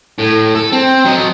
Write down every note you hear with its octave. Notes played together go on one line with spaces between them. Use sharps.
A2
A4
C4
F#3 D#5